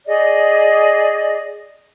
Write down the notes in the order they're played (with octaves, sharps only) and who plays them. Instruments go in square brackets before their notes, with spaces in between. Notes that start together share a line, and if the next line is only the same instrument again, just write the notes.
[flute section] G#4 D5 D#5